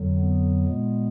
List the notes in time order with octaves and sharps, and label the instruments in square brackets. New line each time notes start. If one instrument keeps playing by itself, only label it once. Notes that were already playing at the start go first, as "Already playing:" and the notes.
Already playing: [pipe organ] F2 D3 F#3
B3
A#2 G#3